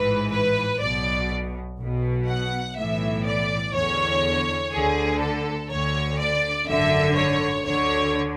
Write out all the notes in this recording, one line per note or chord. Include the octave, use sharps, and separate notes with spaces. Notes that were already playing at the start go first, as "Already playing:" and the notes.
Already playing: A1 G#2 E3 B4
B4
B1 B2 D5
B1 B2
F#5
B1 A2 E3 E5
D5
E2 D3 C#5
D2 D3 G#4
A4
D2 D3 C#5
D5
G#1 F#2 D3 E5
C#5
D2 D3 C#5